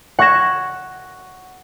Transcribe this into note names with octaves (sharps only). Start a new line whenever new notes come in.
F#5 C#6 G#6 A#6 E7